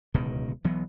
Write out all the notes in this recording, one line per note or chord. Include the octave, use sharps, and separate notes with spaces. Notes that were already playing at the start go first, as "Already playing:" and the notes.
D1 C#2 B2 D#3
B1 E3 F#3 B3